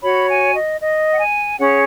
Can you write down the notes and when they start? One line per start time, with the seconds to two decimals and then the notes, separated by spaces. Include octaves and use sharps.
0.02 F#4 C#5 B5
0.28 G#5
0.54 D#5
0.81 D#5
1.13 F#5
1.19 G#5
1.58 C#4 G#4 C#5 F#5